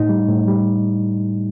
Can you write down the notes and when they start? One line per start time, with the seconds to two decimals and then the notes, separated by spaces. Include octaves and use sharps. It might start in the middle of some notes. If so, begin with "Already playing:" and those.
Already playing: A2 D#4
0.09 G3
0.28 A2
0.48 G3